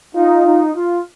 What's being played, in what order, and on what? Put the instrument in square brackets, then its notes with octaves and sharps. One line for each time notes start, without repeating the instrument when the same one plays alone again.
[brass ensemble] D#4 [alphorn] F4
[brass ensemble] D#4
F4